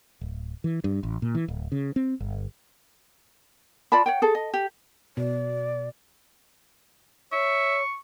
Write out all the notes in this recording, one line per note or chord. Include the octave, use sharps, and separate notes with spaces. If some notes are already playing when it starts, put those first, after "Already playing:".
D1
E3
G2
A1
A#2
E3
D1
C#3
C4
G1
F4 D5 A5 B5
C#5 F#5 G5
G#4 A4
D#5
G4
B2 D5
C#5 E5 C#6